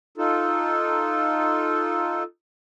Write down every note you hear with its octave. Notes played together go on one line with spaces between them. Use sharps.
D#4 F4 A4